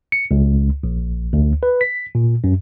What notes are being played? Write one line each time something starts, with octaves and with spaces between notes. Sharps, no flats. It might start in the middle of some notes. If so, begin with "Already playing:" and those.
C#7
C#2
A#1
D2
B4
B6
A#2
F#2